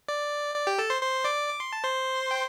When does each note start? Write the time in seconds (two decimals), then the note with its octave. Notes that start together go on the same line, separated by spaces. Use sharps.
0.09 D5
0.55 D5
0.67 G4 G5
0.79 A4 A5
0.90 C5 C6
1.01 C5 C6
1.24 D5 D6
1.48 D6
1.60 C6
1.72 A5
1.84 C5 C6
2.31 G5